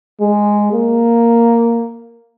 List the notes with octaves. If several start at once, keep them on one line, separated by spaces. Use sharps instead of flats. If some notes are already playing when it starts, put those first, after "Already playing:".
G#3
A#3